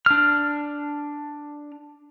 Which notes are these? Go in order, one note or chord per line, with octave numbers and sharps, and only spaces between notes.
D4 F6